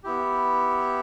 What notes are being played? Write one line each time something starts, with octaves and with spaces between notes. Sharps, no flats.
B3 E4 G4